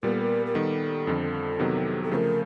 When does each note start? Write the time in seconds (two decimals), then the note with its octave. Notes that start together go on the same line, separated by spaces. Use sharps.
0.02 A#2 G3 B3 A#4
0.12 A4
0.21 A#4
0.46 A#4
0.55 D#3 G3 B3 A4
1.07 F2 D3 F3
1.59 C3 D#3 F#3 B3
2.03 A4
2.11 C#3 F3 A3 A#4 C5